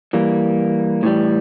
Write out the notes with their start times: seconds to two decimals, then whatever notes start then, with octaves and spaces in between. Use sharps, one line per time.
0.13 E3 G3 A#3
1.03 A2 E3 G3